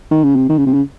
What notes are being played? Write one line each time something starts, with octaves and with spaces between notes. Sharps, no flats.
D#3
C#3
C3
D#3
C#3
C3
C#3